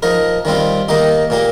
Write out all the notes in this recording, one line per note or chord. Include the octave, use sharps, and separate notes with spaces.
F3 D#4 A#4
D#3 G3 C4 F4
D#3 A#3 D#4 G4
A#2 A#3 G4